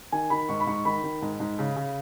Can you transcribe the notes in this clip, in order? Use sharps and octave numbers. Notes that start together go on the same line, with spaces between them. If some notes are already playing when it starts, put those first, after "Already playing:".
D#3 G#5
D#3 B5
G#2 C#6
B5
G#2 C#6
D#3 B5
D#3
G#2
G#2
C#3
C#3